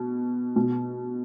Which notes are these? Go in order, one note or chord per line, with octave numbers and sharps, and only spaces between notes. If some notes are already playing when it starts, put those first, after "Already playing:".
Already playing: B2
B2